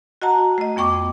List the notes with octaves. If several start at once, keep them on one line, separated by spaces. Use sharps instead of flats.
F#4 D#5 F#5 A5 A#5
A3 D#5
F2 B3 G5 C#6 D6